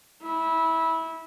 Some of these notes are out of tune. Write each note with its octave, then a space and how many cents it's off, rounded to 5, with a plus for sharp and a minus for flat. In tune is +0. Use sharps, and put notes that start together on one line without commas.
E4 -20